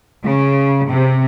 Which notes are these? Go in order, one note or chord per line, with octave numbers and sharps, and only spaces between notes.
C#3
C3